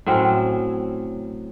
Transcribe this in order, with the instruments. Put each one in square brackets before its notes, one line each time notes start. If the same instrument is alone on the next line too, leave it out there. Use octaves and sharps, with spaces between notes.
[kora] A2 F#3 C4 C#4